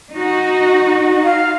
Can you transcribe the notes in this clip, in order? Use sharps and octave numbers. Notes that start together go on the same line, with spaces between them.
D#4 F#4
F5